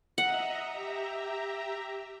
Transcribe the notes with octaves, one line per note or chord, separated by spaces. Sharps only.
D#5 E5 F#5 A#5
G4 E5 A#5